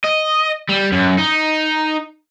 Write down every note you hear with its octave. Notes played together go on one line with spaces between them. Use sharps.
D#5
G3
F#2
D#4